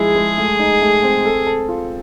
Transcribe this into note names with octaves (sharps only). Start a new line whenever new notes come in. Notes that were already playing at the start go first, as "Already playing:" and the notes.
Already playing: F3 G#3 E4 G#4
G#3
A3
D#4
A3
C4
A4
A4
F4